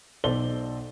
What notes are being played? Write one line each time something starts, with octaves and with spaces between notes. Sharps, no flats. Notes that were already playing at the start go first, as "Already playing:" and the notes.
B1 A4 C5 D5 G7